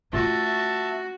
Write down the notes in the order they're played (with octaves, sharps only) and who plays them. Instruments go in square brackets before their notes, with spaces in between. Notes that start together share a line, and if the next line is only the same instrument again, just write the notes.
[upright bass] A3 C#4 [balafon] F4 [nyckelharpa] F#4 [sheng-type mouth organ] E5 A5